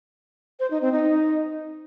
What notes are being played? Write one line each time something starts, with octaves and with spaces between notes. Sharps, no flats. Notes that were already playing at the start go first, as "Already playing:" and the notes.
C5
D#4
C4
D#4